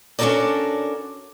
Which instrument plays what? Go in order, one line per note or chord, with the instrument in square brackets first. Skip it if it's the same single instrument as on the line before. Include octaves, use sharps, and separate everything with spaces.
[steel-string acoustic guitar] C#4 D4 F#4 A4 A#4 D5